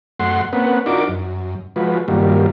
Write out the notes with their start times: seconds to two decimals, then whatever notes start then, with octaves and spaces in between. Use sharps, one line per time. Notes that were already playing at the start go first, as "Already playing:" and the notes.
0.19 F#2 A3 F#5 C6
0.53 A#3 C4 C#4 B4 F#5
0.86 D4 D#4 F4 F#4 A#4 D6
1.08 F#2
1.76 F3 G#3 F4 F#4 B4
2.08 G2 D#3 F#3 G3 A#3 F4